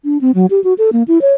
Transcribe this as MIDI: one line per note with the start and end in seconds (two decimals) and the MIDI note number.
0.05 0.18 62
0.21 0.31 60
0.35 0.46 54
0.51 0.62 67
0.64 0.74 66
0.78 0.90 69
0.93 1.03 58
1.08 1.21 64
1.21 1.34 73